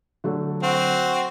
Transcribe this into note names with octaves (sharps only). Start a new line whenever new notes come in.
D3 F#3 A3
C4 F#4